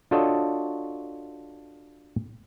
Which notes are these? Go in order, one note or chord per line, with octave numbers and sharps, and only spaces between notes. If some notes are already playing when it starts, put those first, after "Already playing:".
D4 F4 F#4 A4 C#5 D#5